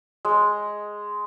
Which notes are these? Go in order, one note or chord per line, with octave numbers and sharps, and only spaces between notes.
G#3